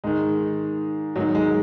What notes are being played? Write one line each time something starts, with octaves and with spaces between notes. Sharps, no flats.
G#2 D#3 G#3
G#2 D#3 F#3
G#3